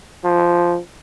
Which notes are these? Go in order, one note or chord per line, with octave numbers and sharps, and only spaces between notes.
F3